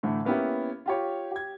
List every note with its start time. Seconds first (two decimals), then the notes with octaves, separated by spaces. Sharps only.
0.03 A2 D3 E3 A3
0.25 A#3 B3 C#4 E4 G4
0.86 F4 G4 C#5
1.31 G4 G#6